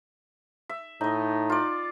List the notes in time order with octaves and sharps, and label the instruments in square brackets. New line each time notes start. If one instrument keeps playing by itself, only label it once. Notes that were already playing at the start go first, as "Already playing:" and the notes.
[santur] E5
[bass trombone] A2 [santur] D#4 D#5
[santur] F4 D5